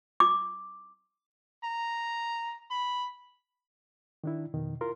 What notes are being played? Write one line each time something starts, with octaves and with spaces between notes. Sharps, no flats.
D6
A#5
B5
D#3 D4 E4
F2 B2 D#3
E4 F4 A#4 C6